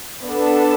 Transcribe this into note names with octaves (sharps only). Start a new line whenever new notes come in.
B3 D4 A4